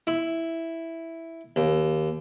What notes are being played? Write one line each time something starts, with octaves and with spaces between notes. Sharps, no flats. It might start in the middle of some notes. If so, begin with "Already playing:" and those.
E4
D#2